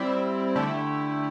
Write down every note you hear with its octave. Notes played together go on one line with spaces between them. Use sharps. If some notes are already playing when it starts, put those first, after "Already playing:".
Already playing: G3 C4 E4
D3 A3 E4 G4